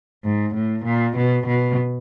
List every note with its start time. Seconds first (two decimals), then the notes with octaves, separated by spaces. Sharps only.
0.24 G#2
0.55 A2
0.85 A#2
1.16 B2
1.47 B2